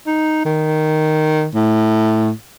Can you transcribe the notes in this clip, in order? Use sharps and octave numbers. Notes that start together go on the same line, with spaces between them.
D#4
D#3
A2